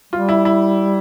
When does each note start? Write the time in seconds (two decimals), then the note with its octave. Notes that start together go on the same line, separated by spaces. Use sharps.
0.13 G3 F4
0.29 E4
0.45 E4